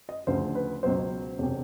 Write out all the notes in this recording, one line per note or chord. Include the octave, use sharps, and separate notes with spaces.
D#5
D2 C#3 F3 C5
B4
C#2 B2 F#3 C5
E1 C3